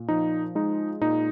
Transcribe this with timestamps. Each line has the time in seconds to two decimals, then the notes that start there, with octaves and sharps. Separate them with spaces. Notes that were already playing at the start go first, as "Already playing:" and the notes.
Already playing: A#2
0.08 F3 D#4
0.55 G#3 D#4
1.01 A#2 D#4